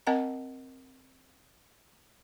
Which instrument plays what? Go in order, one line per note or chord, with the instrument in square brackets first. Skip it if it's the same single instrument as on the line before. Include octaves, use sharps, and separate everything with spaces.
[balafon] C4 A#4 D#5 F#5 A5 A#5